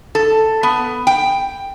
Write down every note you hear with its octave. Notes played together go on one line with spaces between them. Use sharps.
A4
B3
G5